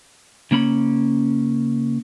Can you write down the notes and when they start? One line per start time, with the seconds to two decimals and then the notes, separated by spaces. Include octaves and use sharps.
0.51 C#3 A#3 C#4 B5